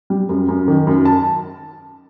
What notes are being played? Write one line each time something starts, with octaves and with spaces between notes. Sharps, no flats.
G3
F#2
F#2
D#3
F#2
A5